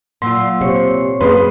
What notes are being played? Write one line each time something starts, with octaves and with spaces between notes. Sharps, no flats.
A#2 F#3 F4 C6 E6
C3 C5 C#5 C#6
F#2 G#3 A#3 B4 B5 C6